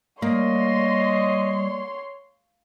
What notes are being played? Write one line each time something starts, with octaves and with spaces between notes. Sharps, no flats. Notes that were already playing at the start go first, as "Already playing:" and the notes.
G3 A#3 C#5 D#5 C6